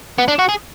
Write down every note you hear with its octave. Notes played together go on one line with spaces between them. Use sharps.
B3
D4
F#4
G#4